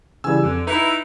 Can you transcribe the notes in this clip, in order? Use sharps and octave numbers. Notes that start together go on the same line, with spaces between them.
C#3 E3 G3 G#5 E6
F2 D3
D#4 E4 B4 A#5